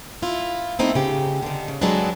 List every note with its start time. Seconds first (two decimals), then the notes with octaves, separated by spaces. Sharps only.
0.22 E4 F4
0.79 A3 B3 C4 D#4 E4
0.95 C#3 G4
1.43 D3 D#3
1.68 C#3
1.81 F#3 G#3 B3 C4 D4 B4